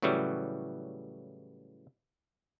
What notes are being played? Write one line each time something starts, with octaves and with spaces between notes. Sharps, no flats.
A2 C#3 E3 F#3 G3